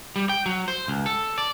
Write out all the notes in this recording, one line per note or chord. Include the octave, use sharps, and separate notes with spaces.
G3
G5
F#3
C5
C#2
A4
D5